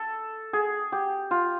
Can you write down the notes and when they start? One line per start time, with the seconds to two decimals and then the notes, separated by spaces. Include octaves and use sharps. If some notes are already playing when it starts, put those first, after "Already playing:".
Already playing: A4
0.53 G#4
0.92 G4
1.31 F4